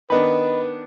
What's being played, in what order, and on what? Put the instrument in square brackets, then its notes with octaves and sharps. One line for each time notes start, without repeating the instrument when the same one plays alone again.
[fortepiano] D#3 B3 D4 [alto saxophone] B4 [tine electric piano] D#5 B5